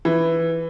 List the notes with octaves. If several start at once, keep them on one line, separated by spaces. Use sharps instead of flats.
E3